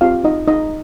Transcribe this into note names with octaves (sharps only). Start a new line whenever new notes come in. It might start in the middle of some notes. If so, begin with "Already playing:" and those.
C4 F4 G4 F5
D#4 D#5
D#4 D#5